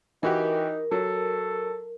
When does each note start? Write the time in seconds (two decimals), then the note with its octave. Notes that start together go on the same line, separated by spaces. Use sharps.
0.23 E3 D#4 F#4 G4 A#4
0.91 F#3 A4